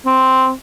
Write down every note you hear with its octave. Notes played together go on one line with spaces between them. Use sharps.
C4